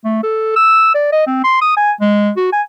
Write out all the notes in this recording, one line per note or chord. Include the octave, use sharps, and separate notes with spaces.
A3
A4
E6
D5
D#5
C4
C6
D#6
G#5
G#3
F#4
G#5